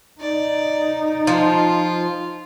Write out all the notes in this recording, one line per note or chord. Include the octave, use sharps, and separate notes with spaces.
D#4 D5
F3 F4